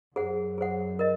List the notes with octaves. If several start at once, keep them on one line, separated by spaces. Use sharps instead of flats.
F#2 G#4 C5 F#5
G#4 C5 F#5
A#4 D#5